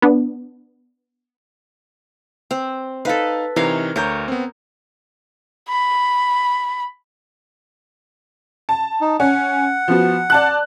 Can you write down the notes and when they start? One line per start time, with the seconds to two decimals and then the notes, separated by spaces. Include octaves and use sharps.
0.02 B3 D4
2.51 C4
3.05 D#4 A4 B4 F5
3.56 C3 E3 D#4 A#4 C#5 F5
3.96 D2 A#4 C#5 G6
4.28 B3 C4
5.69 B5
8.69 A5
9.01 D#4
9.20 C#4 F#5
9.88 F3 B3 F#4
10.30 D5 A5 F#6